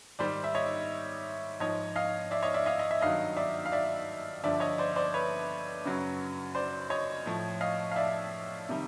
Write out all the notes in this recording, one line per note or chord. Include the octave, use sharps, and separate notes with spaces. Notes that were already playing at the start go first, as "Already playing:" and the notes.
G#2 D#3 G3 C5 D5
E5
C#5 D#5
G#2 F3 C#5 D#5
D#5 F5
D5 E5
C#5 D#5
D5 E5
D#5 F5
D#5
E5
G2 D#3 F#3 D#5 F5
D5 E5
F5
D5 E5
G2 D3 F3 D5 E5
C#5 D#5
C5 D5
C5 D5
B4 C#5
F#2 C#3 F#3
C5 D5
C#5 D#5
A2 F3
D#5 F5
F5
D5 E5
C3 D#3 G3